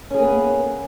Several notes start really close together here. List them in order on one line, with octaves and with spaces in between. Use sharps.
C#4 G#4 A#3 B3